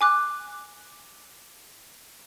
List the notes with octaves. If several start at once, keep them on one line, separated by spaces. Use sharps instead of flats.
G#5 D6 F#6